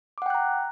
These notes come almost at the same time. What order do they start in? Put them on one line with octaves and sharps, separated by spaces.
D6 F#5 G5 F#6 A#5